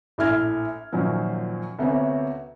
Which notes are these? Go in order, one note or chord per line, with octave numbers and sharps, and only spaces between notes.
A#1 A2 E4 F6 G#6
F#2 A#2 D#3 F3 F#3
D2 C3 B3 C#4